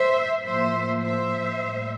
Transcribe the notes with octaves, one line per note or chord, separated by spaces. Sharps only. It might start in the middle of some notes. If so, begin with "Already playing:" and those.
Already playing: C5 E5
A2 F3 A#3 C5 E5
C5 E5
A2 G3 A#3